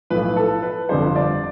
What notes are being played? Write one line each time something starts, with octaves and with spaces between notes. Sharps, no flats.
B1 A2 F3 B4
A4
B4
G1 F2 D3 G3 C5
D5